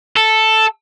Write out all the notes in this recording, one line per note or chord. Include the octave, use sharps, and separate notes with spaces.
A4